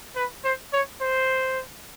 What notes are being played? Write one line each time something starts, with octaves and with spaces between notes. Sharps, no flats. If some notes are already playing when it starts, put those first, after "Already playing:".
B4
C5
C#5
C5